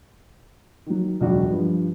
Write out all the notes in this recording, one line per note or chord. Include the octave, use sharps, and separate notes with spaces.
D#3 F#3
E1 C#2 F#2 F#4 D5
G2 F3